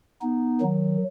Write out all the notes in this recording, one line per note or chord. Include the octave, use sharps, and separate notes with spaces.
B3 D#4
D#3 F#3